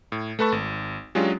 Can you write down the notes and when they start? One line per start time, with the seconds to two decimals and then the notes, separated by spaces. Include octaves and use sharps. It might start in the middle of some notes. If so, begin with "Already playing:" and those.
0.12 A2
0.39 A3 A4 B4 A5 C#6
0.52 G#1
1.15 F#3 G#3 C#4 D4 F4 G4